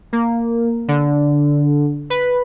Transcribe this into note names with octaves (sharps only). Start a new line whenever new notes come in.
A#3
D3
B4